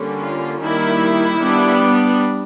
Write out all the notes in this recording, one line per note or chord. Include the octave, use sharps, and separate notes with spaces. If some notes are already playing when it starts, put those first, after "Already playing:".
Already playing: D3 G3 A#3 C#4
F4
D#3 G3 A#3 E4
G3 B3 D4